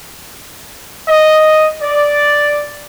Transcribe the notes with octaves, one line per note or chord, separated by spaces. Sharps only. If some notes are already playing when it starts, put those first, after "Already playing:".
D#5
D5